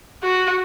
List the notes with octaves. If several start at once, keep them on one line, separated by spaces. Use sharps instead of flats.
F#4